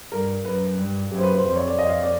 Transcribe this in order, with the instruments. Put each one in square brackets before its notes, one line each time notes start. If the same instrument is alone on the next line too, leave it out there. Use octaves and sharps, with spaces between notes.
[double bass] G2 [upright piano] A#4
[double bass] F#2 [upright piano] B4
[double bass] G2
[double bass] F#2 [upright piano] G4
[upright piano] C5
B4
C5
[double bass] F2 [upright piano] C5
[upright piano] C#5
D5
[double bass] F2 [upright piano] D#5
[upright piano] F5
D5